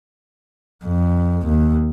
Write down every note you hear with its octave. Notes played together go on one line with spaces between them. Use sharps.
F2
D#2